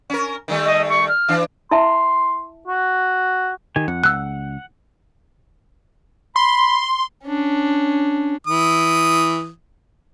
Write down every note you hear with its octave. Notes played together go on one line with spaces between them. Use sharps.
C#4 A#4
D#3 G3 A3
D#5
C#6
F6
E3 D4
E4 E5 A5 C6
F#4
D#3 G4 G#5
F2 F#5
C#2 E6 F#6
B5 C6
C#4 D4
E3 D#6